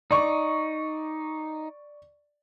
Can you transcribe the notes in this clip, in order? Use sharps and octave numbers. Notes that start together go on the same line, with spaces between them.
D#4 D5 C#6